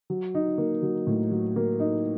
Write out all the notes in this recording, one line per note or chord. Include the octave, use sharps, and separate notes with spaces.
F#3
D#4
A#3
F#3
A2
F#3
A#3
D#4